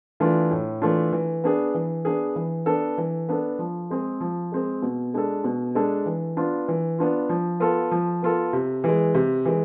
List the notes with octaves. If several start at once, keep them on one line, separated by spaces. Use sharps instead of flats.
E3 A3 D4 F4
A2
E3 A3 D4 F4
E3
B3 D4 G#4
E3
B3 D4 G#4
E3
B3 D4 A4
E3
B3 D4 A4
F3
G#3 C4 G#4
F3
G#3 C4 G#4
B2
G#3 D4 A4
B2
G#3 D4 A4
E3
B3 D4 F4
E3
B3 D4 F4
F3
B3 F4 A4
F3
B3 F4 A4
C3
E3 G#3
C3
E3 G#3